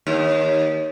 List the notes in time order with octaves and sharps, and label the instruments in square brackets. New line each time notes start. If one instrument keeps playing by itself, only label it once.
[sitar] D#2